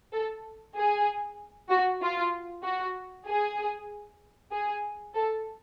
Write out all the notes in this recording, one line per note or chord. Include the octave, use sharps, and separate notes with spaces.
A4
G#4
F#4
F4
F#4
G#4
G#4
A4